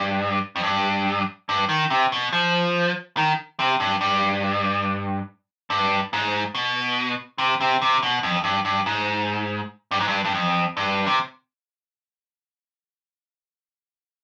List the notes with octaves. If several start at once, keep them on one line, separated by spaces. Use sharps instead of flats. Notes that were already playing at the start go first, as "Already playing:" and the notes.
Already playing: G2
F2
G2
G2
D#3
C3
B2
F3
D#3
C3
G2
G2
G2
G#2
B2
C3
C3
C3
B2
F2
G2
G2
G#2
G2
G#2
G2
G2
F2
G2
C3